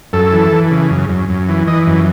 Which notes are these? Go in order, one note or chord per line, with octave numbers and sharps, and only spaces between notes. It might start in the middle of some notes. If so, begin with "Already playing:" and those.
F#2 A4
E3
E3
C#3
F#2
F#2
F#2
E3
E3 D#5
F#2